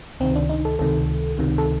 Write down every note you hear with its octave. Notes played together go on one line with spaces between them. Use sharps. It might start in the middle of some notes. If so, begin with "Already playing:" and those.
C#2 C3 D#3 C4
D4
D#4
A4
C#2 C3 D#3 A4
C#2 C3 D#3
A4